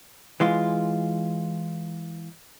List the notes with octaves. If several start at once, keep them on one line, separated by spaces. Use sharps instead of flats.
E3 G#3 F4